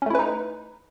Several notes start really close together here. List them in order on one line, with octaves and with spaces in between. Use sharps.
C#4 A3 E4 B4 D#4